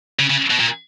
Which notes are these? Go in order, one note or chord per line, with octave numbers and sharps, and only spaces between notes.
C#3
C#3
B2
A#2